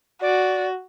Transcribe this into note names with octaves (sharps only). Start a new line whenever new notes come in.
F#4 D5